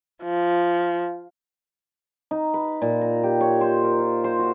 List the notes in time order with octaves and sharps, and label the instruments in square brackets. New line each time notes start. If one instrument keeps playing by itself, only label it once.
[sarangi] F3
[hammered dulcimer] D#4
B4
A#2
A#5
G4
C#5
C5
A#4
F4
C5
F#4